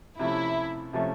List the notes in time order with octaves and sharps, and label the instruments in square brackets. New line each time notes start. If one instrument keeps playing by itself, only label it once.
[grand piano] C3 F3 A3 C#4 [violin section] E4
[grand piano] C3 F3 A3 C#4